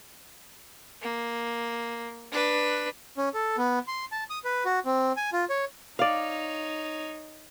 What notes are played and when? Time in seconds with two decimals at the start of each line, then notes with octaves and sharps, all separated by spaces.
1.02 A#3
2.32 D4 B4
3.17 C#4
3.34 A4
3.57 B3
3.88 C6
4.12 A5
4.30 D#6
4.45 B4
4.65 F#4
4.85 C4
5.17 G#5
5.33 F4
5.50 C#5
5.99 D#4 C#5 D5 F5